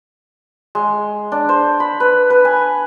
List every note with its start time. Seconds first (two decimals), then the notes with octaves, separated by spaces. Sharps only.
0.75 G#3
1.32 D4
1.49 C5
1.80 B5
2.00 B4
2.30 B4
2.45 G#5